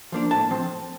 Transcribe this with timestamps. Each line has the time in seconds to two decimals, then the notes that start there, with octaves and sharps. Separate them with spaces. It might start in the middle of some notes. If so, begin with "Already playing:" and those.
0.12 F3 A#3 D4
0.31 A2 A5
0.50 F3 C4